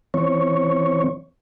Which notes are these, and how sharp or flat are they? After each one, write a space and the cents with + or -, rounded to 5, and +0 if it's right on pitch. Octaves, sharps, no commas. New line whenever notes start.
E3 +5 C4 +0 C#5 +0